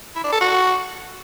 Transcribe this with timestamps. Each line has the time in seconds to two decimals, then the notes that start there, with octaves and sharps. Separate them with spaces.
0.16 E4
0.24 D4
0.33 A4
0.41 F#4